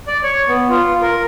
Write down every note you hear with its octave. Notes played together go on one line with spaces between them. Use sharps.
D5
C#5
B3
F4
A#4